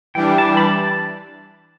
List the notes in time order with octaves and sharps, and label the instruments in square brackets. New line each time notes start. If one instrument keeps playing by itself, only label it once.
[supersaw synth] E3 G3 D4 [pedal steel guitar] G5
[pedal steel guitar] A5
B5
A5